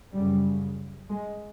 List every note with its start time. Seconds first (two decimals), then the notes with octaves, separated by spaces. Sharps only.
0.12 F#2 C#3 G3
1.10 G#3